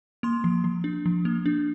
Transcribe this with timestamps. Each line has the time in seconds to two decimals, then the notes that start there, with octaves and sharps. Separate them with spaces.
0.23 A#3 C6
0.44 F3
0.64 F3
0.84 D4
1.06 F3
1.25 A#3
1.46 D4